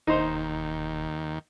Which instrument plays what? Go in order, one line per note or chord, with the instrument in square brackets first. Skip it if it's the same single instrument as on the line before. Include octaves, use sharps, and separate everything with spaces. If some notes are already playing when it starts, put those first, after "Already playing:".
[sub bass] E1 [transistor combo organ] D#2 [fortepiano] D#4 C5